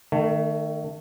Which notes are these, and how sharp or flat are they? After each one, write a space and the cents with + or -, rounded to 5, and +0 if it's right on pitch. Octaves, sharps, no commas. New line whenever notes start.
D#3 -30 A3 +20